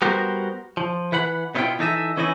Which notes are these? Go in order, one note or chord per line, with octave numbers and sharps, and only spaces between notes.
G3 B3 F#4 A#4 C5
F3
E3 B4 F#5 B5
B2 B3 C4 E4 F4 G5
E3 D#4 A4 D#5 E5
E3 C#4 D#4 E4 D5 D#5